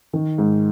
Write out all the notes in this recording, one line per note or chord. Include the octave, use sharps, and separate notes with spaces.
D#3
G#2